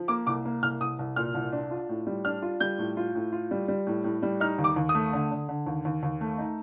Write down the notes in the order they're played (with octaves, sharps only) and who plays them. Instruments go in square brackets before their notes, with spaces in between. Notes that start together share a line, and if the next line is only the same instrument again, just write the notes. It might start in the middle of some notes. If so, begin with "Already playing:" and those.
Already playing: [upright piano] F3
A#3 D6
C2 D6
A#3
C2 F6
C2 D#6
C2
A#2 F6
C2
D4
F4
A2
G3
D4 F6
F4
G3 G6
A2
F4
A2
F4
G3
G3
A2
A2
G3
D#4 F6
D#2
D6
D#2
D#6
A3
D3
D3
D3
D#2
D#2
D#2
A3
D#4